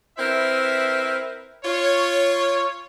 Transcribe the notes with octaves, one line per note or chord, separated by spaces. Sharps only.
C4 E4 A#4 B4 E5
F4 C#5